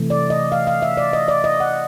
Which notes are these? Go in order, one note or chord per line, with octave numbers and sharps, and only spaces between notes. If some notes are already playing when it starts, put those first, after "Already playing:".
Already playing: C3 E3 A3
D5
D#5
F5
F5
E5
D5
D#5
D5
D#5
F#5